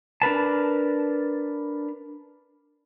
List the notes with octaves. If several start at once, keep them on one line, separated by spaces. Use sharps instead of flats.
D4 A#4 B4 A5